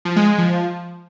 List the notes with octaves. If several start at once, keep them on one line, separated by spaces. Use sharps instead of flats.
F3
G#3
G#3
F3